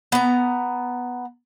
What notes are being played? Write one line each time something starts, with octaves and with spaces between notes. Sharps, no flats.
B3 A#5